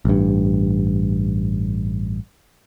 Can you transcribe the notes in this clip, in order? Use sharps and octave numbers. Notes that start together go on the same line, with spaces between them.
A1 G2